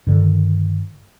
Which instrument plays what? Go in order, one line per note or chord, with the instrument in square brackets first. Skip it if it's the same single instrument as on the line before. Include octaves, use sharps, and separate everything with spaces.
[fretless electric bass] G2 D3 D#3